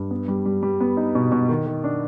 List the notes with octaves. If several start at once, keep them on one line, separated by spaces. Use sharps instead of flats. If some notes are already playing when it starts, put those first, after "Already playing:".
Already playing: G2
B3
G3
G3
G3
B3
D#4
B2
B2
D#3
D#3
D4